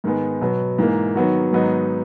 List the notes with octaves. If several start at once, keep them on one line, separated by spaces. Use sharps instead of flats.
G#2 D#3 G#3 B3
B2 F#3 B3
G#2 E3 A#3
D#3 F#3 B3 F#4
G#2 D#3 F#3 B3 D#4